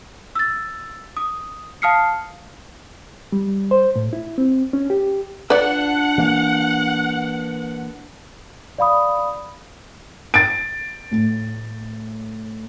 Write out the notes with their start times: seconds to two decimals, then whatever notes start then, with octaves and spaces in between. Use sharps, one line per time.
0.35 E6 A6
1.17 D#6
1.82 F5 A5 D#6 F6 C7 C#7
3.32 G3
3.71 C5
3.96 A2
4.13 E4
4.38 C4
4.73 C#4
4.90 G4
5.50 D4 F4 B4 D5 F#5
6.18 E3 A#3
8.78 D5 F5 B5 D#6
10.34 A6 D7
11.11 A2